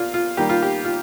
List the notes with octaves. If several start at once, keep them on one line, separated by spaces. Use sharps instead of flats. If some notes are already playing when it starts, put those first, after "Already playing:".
Already playing: A#2 F4
F4
D#3 G3 A#3 G4
F4
G4
F4